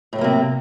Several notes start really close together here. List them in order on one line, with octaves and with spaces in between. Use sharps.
A2 A3 F#3 A#3 C3